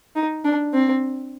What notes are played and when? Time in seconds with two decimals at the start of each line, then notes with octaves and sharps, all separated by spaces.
0.16 D#4
0.45 D4
0.74 C4